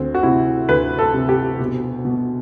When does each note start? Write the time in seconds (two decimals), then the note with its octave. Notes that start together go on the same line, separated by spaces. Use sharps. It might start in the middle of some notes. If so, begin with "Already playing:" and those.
Already playing: D2 C4
0.15 F#4
0.23 C3 E4
0.69 D2 B4
0.99 A4
1.14 C3
1.29 G4
1.59 B2
2.05 B2